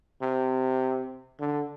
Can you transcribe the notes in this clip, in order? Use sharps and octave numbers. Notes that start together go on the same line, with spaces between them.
C3
D3